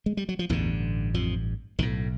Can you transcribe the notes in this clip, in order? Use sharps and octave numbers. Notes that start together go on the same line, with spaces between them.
G#3
G3
F#3
F3
A1 E2 G2 D3 E3
F2 F3
B1 A2 D#3